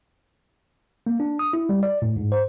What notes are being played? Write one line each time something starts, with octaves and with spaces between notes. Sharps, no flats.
A#3
D4
D#6
E4
G3
D5
A2
G#2
C5